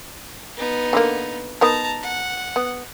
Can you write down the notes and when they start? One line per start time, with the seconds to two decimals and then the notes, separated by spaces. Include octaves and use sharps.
0.57 B3 D#4
0.93 D3 G#3 A#3
1.61 B3 D#4 A#4 A5 A#5
2.03 F#5
2.56 B3